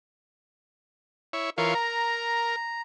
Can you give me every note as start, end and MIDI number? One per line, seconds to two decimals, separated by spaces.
1.33 1.50 64
1.33 1.50 73
1.58 1.74 52
1.58 1.74 65
1.58 1.72 70
1.58 1.74 73
1.58 1.72 77
1.75 2.56 70
1.75 2.81 82